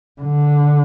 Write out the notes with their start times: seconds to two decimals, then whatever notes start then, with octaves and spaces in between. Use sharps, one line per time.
0.21 D3